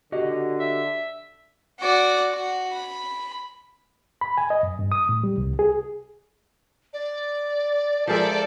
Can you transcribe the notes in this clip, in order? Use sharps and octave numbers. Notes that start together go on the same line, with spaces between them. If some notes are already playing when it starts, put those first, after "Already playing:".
D3 F#4 G4 D#5
E5
F#4 D5
F#4
B5
B5
G#5
D#5
F#2
G2
D#6
A2
G3
C2
G#4
D5
F3 G#3 A4 A#4 D5 E5